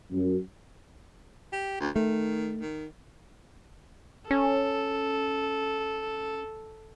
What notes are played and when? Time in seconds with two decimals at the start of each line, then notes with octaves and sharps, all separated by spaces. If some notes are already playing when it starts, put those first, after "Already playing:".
0.12 F#2
1.52 G4
1.81 D2
1.96 D#3 A3
2.61 D#3
4.31 C#4 A4